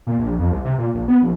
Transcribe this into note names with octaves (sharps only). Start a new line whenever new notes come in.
A#2
A#1
F2
C2
C3
A#2
A#1
B3
A#1